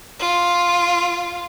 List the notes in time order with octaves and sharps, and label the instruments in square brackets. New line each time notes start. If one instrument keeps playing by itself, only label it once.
[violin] F4